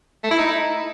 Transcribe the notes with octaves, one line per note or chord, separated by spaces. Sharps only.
A3
E4
D#4